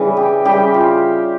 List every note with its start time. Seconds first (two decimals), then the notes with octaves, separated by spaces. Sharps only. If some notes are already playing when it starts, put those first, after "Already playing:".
Already playing: C#3 E3 G3
0.17 G4
0.45 C#3 E3 G3 G4
0.74 F4